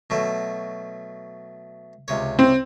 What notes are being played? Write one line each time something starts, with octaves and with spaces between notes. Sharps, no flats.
B2 F#3 A3
C#2 C3 C#5
C4